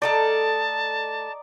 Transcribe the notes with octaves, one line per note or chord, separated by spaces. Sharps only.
A3 A4 D5 D#5 F5 A5 A#5